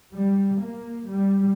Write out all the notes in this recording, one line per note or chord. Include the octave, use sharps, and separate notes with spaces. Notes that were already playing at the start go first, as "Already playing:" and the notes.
G3
A#3
G3